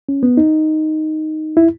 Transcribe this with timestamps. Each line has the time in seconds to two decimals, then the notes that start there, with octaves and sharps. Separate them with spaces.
0.09 C#4
0.23 B3
0.37 D#4
1.57 E4